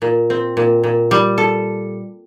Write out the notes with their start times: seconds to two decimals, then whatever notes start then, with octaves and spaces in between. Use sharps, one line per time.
0.02 A#2
0.30 C4
0.57 A#2
0.84 A#2
1.11 G3
1.38 A4